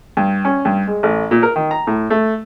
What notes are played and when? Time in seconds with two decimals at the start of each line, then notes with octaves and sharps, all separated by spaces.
0.17 G2
0.45 C#4
0.65 G2
0.87 G#3
1.03 A1
1.31 A#2
1.43 A#4
1.56 D#3
1.71 A#5
1.87 A2
2.10 A3